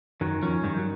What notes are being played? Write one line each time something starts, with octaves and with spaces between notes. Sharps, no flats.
F#2 D#3 F#3
F2 F3 C#4
G2 D#3 G3
F#3